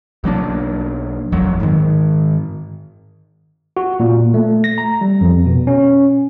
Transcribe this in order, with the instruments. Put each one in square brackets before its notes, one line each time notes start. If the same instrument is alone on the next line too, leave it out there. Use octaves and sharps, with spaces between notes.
[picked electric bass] B1 F#3 A#3 D4
D#1 G#1 F2 F#3
G#2 D#3
[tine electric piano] F#4
A#2
A3
A#6
A#5
G3
F2
B2
C#4